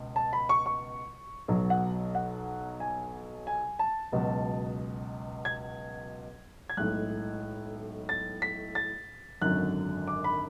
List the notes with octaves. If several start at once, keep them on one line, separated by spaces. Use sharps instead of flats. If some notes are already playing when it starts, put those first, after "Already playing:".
Already playing: C#2 B2
A5
B5
C#6
C#6
B1 B2 F#3
F#5
F#5
G#5
G#5
A5
C#2 B2 F#3
G#6
G#6
B1 A2 G#3 F#6
A6
B6
A6
G#1 F#2 D3 F#3 F#6
D6
B5